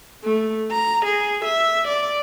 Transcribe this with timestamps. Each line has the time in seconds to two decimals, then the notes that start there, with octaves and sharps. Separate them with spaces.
0.24 A3
0.72 A#5
1.05 G#4
1.44 E5
1.87 D5